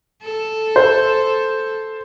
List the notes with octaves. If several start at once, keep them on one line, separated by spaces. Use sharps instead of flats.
A4
C5